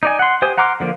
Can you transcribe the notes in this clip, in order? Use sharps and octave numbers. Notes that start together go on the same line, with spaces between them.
D#4 D5 G#5
F#5 C6
G4 C5 G#5 D#6
F#5 A#5 C6 D6 F6
D3 F3 A#3